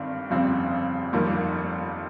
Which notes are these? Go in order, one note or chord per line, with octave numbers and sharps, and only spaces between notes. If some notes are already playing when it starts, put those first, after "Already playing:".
Already playing: G1 G2 D#3 C4
G1 F2 C#3 G3 C4
G1 F2 D#3 G3 A#3